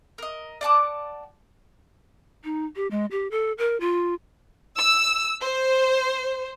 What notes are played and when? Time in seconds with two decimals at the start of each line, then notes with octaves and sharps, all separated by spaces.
0.18 A#4 D#5
0.61 D5 F#5 A5 D6
2.44 D#4
2.76 G4
2.91 G#3
3.11 G4
3.31 A4
3.58 A#4
3.80 F4
4.80 E6
5.42 C5